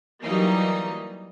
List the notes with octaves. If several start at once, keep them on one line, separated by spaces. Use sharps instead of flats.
E3 F#3 G3 A#3 D#4